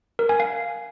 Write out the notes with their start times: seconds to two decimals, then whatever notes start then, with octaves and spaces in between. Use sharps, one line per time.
0.19 A#4
0.29 G#5
0.40 F5